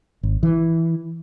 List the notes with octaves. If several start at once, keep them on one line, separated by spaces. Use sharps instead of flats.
G#1
E3